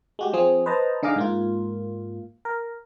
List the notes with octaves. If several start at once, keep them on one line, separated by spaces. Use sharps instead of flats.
G#3 F#4 G4
F3 C4 G#4
B4 C5 D#5 A5 A#5
D3 D#4 G#4 D#5 F5 D6
G#2 A#3 F4
A#4